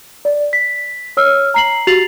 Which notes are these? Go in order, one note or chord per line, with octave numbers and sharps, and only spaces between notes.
D5
B6
C#5 E6 F6
A#5 C7 F#7
F#4 G4 A6 C7 F7 F#7